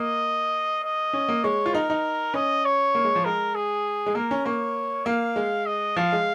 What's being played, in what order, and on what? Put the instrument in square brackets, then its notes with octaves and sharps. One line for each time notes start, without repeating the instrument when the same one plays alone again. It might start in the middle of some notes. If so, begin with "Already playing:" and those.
Already playing: [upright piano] A#3 [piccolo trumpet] D#5
[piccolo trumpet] D#5
[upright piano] C#4
A#3
[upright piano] G#3 [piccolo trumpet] C#5
[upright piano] F4
[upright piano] D#4 [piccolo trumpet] A#4
[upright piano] D#4
[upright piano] C#4 [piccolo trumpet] D#5
[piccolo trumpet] C#5
[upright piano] A#3
G#3
F3
[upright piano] G#3 [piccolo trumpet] A#4
[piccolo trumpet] G#4
[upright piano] G#3
[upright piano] A#3 [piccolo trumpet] A#4
[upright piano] C#4
[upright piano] A#3 [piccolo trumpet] C#5
[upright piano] A#3 [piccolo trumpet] F5
[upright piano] G#3
[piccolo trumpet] D#5
[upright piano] F3 [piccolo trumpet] F5
[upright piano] G#3